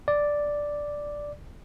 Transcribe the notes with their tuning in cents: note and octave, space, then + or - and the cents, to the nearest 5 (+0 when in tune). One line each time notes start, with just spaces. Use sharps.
D5 +0